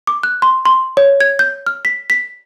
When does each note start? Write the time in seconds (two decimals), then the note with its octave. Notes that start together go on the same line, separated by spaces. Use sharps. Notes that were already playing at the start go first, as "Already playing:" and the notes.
0.07 D6
0.23 F#6
0.42 C6
0.66 C6
0.97 C#5
1.21 G#6
1.39 G6
1.67 F6
1.85 B6
2.10 B6